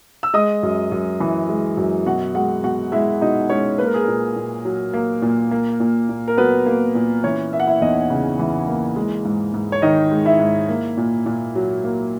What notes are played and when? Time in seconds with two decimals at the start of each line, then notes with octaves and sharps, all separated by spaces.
0.23 E6
0.34 G#3 D#5 D#6
0.63 F#2
0.92 F#2
1.20 E3
1.49 G#3
1.77 F#2
2.06 B2 F#4 F#5
2.35 G#3 F#4 F#5
2.64 B2 F#4 F#5
2.92 G#3 E4 E5
3.21 B2 D#4 D#5
3.50 G#3 C#4 C#5
3.78 A#3 B4
3.86 A#4
3.94 G#4
4.02 A#4
4.08 A#2
4.36 A#2
4.65 F#3
4.94 A#3
5.22 A#2
5.51 A#3
5.80 A#2
6.09 A#2
6.28 A#4
6.37 F#3 B3 B4
6.66 A#3
6.95 A#2
7.24 E3 C#4 C#5
7.52 A#3 E5
7.60 F#5
7.67 E4 E5
7.81 E2 D#4 D#5
8.10 C#3
8.39 E3
8.67 A#3
8.96 G#3
9.25 G#2
9.54 G#2
9.72 C#5
9.82 D#3 D#4 D#5
10.11 G#3
10.25 E4 E5
10.40 G#2
10.68 A#3
10.97 A#2
11.26 A#2
11.55 F#3
11.84 A#3